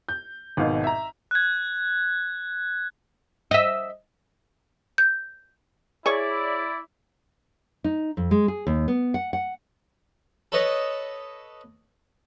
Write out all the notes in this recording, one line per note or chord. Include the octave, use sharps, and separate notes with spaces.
G6
G#1 G#2 B2 F5
E5 A#5
F#6 G#6
D#5 E5
G6
E4 G#4 C#5 D5 C#6
D#4
F2
G#3
G#4
D#2
B3
F#5
F#5
A4 B4 C#5 D#5 A5